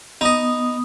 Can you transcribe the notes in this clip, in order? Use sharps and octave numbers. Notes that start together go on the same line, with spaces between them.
B3 D#4 D#5 D#6